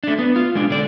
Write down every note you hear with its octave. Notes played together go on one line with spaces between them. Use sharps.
A3 D4
B3
F4
G#3 D4
D3 D5